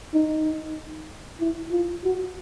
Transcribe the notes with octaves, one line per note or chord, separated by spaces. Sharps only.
D#4
E4
F4
F#4